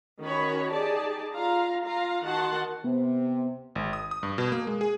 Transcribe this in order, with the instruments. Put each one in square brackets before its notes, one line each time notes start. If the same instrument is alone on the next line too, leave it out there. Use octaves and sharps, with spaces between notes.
[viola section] D#3 C#4 F#4 C#5 B5
D#4 G4 G#4 D5 A5
F4 F5 A#5
F4 F5 A#5
D#3 F#4 F#5 A5 C6
[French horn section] C3 [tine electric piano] B3
[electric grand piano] G#1
D#6
D#6
G2
B2
A#3
G#3
G#4